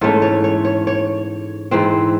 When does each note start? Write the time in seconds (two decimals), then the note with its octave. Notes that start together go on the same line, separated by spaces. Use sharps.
0.01 G#2 E3 A3 C#4 A4
0.22 C#5
0.44 C#5
0.65 C#5
0.87 C#5
1.71 G#2 E3 C4